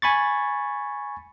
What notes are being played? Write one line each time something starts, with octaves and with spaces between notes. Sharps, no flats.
G#5 B5 C#6 A6